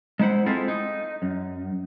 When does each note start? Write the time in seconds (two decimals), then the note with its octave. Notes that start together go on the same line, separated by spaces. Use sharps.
0.19 G#3 D#4 E4 C5 F#5
0.46 G#3 C4 E4 F4 A4
0.68 D#4
1.22 F#2